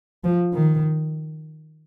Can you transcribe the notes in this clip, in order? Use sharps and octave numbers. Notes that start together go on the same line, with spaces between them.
F3
D#3